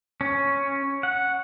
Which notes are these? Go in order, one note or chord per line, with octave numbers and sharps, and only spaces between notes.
C#4
F#5